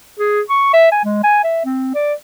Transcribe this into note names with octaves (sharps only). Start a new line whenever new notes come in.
G#4
C#6
E5
G#5
G#3
G#5
E5
C4
D5